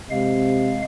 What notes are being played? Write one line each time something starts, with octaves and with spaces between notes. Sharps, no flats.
C3 G#3 F5